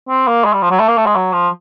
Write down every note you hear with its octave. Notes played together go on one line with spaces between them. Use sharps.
C4
A#3
G#3
G3
F3
F#3
A3
A#3
A3
G#3
F#3
F3